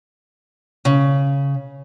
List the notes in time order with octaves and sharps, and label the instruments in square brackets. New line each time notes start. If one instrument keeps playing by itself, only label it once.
[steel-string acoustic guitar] C#3